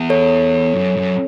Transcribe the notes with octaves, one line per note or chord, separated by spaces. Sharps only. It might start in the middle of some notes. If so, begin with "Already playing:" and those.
Already playing: E2
A4 C#5
F#2
F#2